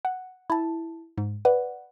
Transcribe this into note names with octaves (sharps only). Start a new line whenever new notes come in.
F#5
E4 A5
G#2
B4 D5 F#5